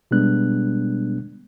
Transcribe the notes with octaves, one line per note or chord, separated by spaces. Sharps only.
B2 G3 G#3 B3 D4 F#6